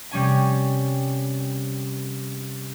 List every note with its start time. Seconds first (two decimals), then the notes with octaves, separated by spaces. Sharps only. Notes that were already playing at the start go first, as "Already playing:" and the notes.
0.11 C3 G3 C#4 G#5